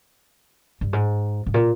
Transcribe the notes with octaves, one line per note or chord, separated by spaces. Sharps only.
G2
G#2
G#2
A#2